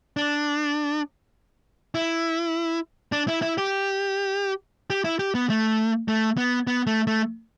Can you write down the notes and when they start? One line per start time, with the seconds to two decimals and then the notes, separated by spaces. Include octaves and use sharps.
0.17 D4
1.95 E4
3.12 D4
3.28 E4
3.42 E4
3.58 G4
4.90 G4
5.04 E4
5.19 G4
5.35 B3
5.50 A3
6.08 A3
6.37 B3
6.67 B3
6.87 A3
7.07 A3